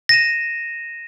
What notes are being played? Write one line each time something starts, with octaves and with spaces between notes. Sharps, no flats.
A#6 D#7 E7